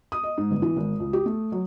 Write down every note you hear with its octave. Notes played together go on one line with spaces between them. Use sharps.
D#6
D#5
G#2
G1
E3
G#1
C#2
G4
A3
F#3